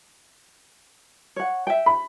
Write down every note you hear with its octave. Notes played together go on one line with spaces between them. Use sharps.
C#5 F#5
E5 G5
B5